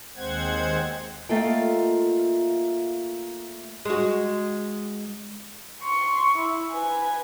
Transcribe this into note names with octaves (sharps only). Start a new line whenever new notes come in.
D#2 G#3 C4 C5 F#5 G#6
A3 A#3 F4 A4 D#5 G5
G#3 F#4
C6 C#6
E4
B4 G#5